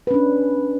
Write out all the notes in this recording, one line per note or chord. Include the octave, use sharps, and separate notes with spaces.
C#4 D4 B4